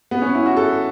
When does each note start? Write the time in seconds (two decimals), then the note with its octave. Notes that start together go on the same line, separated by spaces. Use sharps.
0.11 B3
0.22 C#4
0.35 E4
0.46 F#4
0.57 A4